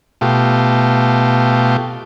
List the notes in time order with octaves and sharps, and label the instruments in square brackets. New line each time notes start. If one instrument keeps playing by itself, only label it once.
[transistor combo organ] B2 A3 F4 G4